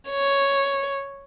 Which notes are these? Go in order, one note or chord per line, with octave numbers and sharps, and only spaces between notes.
C#5